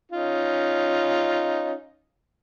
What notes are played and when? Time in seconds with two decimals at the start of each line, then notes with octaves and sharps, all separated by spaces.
0.12 C#4 D#4 F4